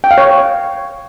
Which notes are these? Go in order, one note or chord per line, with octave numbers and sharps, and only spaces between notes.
G5
F5
C#5